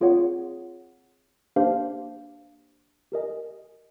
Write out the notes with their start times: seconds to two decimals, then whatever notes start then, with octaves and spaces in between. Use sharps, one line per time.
0.01 C4 F4 G#4 C#5 F#5
1.56 A#3 D4 G4 C5 F5
3.12 G4 A#4 D#5 G#5